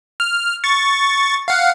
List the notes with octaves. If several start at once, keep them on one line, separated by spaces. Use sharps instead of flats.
F6
C#6 A6
F5 F#5